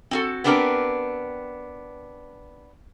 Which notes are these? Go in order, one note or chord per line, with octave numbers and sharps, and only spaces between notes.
C4 F#4 A4
B3 C4 D4 G4 A#4 B4